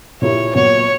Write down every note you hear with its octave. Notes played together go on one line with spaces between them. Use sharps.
A#2 A#3 E4 G4 C#5
A#2 F#3 B3 C#5